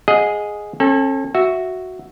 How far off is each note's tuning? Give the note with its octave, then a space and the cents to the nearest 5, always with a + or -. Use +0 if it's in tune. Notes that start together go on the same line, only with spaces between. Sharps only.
G#4 +0 D#5 +0 F#5 -45
C#4 -40 A4 +0
F#4 +0 E5 +0